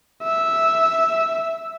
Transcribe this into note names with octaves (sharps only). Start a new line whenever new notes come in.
E5